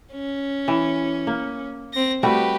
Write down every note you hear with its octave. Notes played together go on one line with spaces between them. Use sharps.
C#4
E3
A#3
C4 A#6
G3 A3 F#4 G4 B4